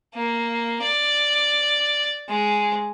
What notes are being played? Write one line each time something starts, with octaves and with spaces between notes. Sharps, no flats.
A#3
D5
G#3